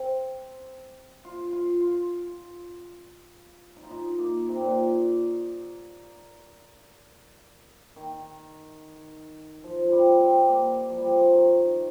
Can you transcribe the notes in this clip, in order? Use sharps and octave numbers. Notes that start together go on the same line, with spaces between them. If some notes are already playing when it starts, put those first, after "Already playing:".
Already playing: C4
F4
F4
F4
D#4
F4
D#4
A#3
C3
A#2
D#3
F3
F3
G3
C4
A#3
F3
G3
F3
D#3